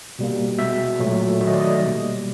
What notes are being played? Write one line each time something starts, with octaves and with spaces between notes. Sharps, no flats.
B2 G3 A#3
B2 G#3 E5
A#2 F#3 A3
D#3 F#3 A3 E5
D#5
D5
D#5
B2 G3 A#3